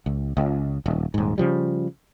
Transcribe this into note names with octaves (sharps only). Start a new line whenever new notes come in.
C#2
C#2
D#1
D#1 G#2
C#3 F3 G3